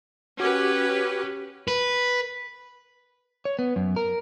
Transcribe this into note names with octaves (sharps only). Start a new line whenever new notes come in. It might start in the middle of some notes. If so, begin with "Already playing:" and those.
C#4 F#4 G4 B4 D6
B4
C#5
B3
F#2
A#4